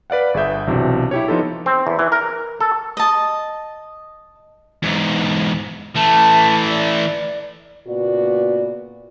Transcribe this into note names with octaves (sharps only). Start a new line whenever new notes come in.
B4 D5 F5 F#5
G1 G#4 B4 E5 G6
B1 C3 E3 D4 F#4
E4 G4 C#5
F3 B3 D#4 F4 A4
C4
E2
E3
A#4
A4
D#5 A5
E2 G#2
E3 A3 A5
D5
A#2 C#3 A#3 B3 F#4 D5